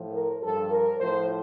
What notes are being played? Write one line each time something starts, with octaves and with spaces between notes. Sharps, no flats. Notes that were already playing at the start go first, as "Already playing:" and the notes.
Already playing: A2 F3
A#4
G2 F3 A4
A#4
A2 F3 C5